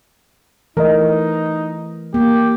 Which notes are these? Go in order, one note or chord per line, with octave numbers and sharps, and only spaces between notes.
E3 A3 D#4 A#4 D#5
A#3 G4